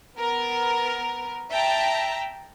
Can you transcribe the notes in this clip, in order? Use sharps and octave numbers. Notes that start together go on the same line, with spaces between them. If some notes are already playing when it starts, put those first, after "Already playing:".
B3 A#4
E5 G5 A5 A#5